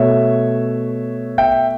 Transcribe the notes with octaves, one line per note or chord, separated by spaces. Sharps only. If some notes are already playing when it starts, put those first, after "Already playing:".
Already playing: B2 A3 C#5 E5
E5 G5